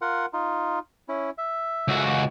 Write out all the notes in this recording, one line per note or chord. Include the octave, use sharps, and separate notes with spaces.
F4 A#4 F#5
D#4 F4
C#4 E4
E5
C#2 F#4